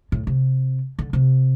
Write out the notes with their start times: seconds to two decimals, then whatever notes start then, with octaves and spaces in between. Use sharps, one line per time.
0.12 A2
0.27 C3
0.99 D3
1.13 C3